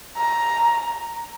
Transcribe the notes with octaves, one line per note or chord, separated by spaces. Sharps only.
A#5